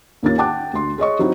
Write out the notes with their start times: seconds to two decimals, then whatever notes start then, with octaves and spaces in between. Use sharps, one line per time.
0.23 D#2 D#3 A#3 C#4 F4 A6
0.38 F#5 G5 A5 D6 F#6
0.73 D2 C6
0.98 G#4 C#5 D#5 C#6
1.19 F#3 C4 D#4 E4